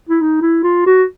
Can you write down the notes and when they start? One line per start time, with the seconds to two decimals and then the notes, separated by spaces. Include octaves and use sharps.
0.09 E4
0.21 D#4
0.42 E4
0.63 F4
0.86 F#4